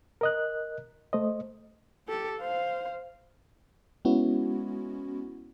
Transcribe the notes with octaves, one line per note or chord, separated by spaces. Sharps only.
A#4 D#5 F#6
A3 C5 D#5
G4 A4
C5 F5
G#3 B3 C#4 E4 F#4